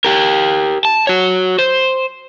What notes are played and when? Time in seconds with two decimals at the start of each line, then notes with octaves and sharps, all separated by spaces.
0.05 G4 A#4
0.85 A5
1.07 F#4 C#5
1.59 C5